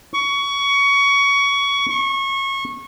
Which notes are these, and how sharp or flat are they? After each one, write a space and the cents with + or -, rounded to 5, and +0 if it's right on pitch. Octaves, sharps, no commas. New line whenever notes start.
C#6 +20
C#6 -25